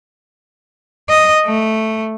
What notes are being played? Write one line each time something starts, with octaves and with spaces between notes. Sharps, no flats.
D#5
A3